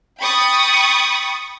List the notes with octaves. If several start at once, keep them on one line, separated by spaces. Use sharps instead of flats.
G5 B5 C#6 D#6 A6